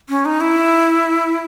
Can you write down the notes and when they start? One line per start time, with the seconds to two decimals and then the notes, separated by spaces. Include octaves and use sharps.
0.09 C#4
0.25 D#4
0.41 E4